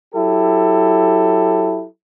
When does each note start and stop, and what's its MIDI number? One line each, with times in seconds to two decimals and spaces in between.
0.15 1.85 54
0.15 1.85 64
0.15 1.85 67
0.15 1.85 69